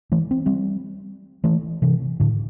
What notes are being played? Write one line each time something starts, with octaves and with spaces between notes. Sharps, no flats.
E3 A3
C4
G3 C4
E3 A3
C3 E3
A2 D3